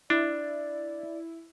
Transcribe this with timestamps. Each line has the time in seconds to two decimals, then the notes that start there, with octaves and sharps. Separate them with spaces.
0.10 D4 E4 D5